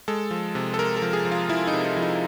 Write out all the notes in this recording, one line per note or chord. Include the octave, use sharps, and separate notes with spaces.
G#3 A4
F3
C3
A4
G#3 A#4
A4
F3
G#4
F3
F4
F3 E4
D#4
C3
D#4
F3
D#4